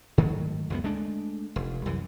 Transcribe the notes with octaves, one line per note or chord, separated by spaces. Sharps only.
G#2 D#3 F#3 A3
C#2 F#2 B3
G#3 A3 D4
F1
C2 F#2 E3